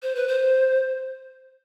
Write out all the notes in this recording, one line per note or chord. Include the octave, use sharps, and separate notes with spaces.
C5
B4
C5